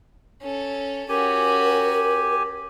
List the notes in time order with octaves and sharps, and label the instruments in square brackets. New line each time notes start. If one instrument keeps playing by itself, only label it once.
[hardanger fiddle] C#4 A4
[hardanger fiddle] C#4 F#4 [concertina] G4 G#5 [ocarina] A#4